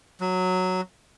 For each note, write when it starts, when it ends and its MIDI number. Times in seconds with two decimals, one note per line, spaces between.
0.20 0.81 54